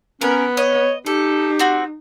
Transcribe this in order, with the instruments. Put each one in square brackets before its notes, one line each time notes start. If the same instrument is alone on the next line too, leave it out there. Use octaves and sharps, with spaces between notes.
[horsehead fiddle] B3 [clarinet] C#4 [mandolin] A#4
[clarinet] C#5 [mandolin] D#5
[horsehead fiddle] D#4 [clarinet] G4 [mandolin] A4
[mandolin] C4 F#4